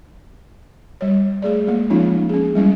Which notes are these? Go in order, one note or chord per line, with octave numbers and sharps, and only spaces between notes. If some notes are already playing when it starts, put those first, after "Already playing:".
G3 C#5
A3 G#4 D5
G#3 A#3
F3 G#3 C#4 D#4 F4
C#4 G#4
G3 G#3 C#4 E4